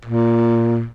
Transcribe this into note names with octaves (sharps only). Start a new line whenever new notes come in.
A#2